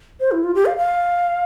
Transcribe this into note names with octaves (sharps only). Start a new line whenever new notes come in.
C5
E4
F4
G4
F5
F5